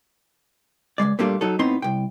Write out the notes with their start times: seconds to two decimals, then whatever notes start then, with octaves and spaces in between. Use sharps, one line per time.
0.98 C#2 B2 G#3 D5
1.19 A#2 G3 A3 A#3 D4 F4
1.41 F#3 D#4 A4
1.59 A2 B3 C4 D#4 A#5 C6
1.82 C2 G5